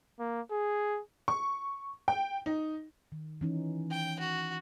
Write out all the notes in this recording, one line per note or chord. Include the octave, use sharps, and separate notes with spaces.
A#3
G#4
C#6
G5
D#4
D#3
E3 C#4 D#4
G5
F#4